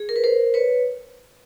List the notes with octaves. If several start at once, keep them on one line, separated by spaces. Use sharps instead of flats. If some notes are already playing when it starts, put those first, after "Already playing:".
Already playing: G#4
A#4
B4
A#4 C5
B4 C#5